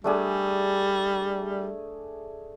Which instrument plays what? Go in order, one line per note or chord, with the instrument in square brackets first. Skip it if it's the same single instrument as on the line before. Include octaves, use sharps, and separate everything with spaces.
[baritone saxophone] G3 [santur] A3 D4 G#4